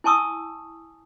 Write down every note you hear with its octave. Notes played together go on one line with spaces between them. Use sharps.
E4 G#5 A5 C#6 D#6 E6